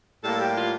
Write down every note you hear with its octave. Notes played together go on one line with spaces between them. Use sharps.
A2 G3 A#3 A4
G4
F4